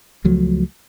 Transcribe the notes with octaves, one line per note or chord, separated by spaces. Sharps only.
C#2 F3 F#3 A3